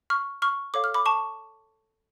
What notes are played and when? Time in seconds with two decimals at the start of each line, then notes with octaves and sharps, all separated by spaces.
0.10 C#6 F6
0.42 C#6 F6
0.74 A4 C#5 F5 D6
0.84 F6
0.94 B5 D6
1.06 A5 C#6